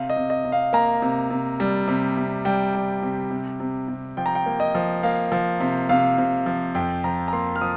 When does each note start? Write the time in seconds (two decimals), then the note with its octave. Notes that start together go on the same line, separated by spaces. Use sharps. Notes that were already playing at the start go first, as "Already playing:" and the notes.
Already playing: C3 F5
0.10 D#5
0.16 C3
0.30 D#5
0.44 C3
0.52 F5
0.73 A#3 A#5
1.02 C3
1.30 C3
1.60 G3
1.88 C3
2.17 C3
2.45 G3 G5
2.75 G3
3.02 C3
3.31 C3
3.60 C3
3.88 C3
4.17 F3 G5
4.26 A#5
4.35 G5
4.46 A#3
4.60 D#5
4.75 F3
5.03 A#3 F5
5.32 F3
5.60 C3
5.89 C3 F5
6.18 C3
6.46 F3
6.75 F2 G5
7.04 F3 A#5
7.28 A#5
7.33 A#3 C6
7.56 F6
7.61 F3 D#6